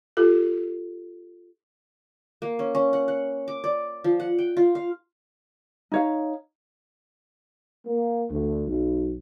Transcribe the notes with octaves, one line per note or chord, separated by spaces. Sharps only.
F4 G4 A4
A#3
C#4
C#4
F#5
F#5
D6
D5
F3
F#5
G5
F4
F5
D#4 C#5 F5
A#3
D2
B1